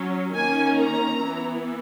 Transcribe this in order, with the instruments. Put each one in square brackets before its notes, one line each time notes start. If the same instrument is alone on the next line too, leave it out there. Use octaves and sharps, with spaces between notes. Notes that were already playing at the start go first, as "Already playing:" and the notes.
Already playing: [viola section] F#3 C#4
D#3 A#3 C#4 G#5
A#5
E3 B3